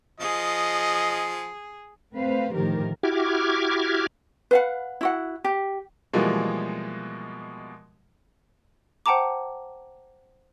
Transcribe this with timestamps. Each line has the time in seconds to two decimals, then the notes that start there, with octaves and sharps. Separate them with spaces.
0.20 F3 G#4 D#5
2.14 A3 C4 B4 C5 F5
2.55 A2 D3 D#3 F3 G4 A#4
3.03 E4 F#4 G4 D6 F6 G#6
4.51 B4 F5 F#5
5.01 E4 F#4 F#5
5.44 G4
6.13 B2 E3 F3 G3 G#3 A#3
9.06 C5 F#5 G5 A5 A#5 D6